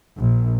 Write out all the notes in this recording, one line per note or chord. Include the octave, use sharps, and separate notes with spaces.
A#1